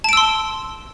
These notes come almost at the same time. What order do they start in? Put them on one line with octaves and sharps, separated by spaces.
A5 D7 E6 C6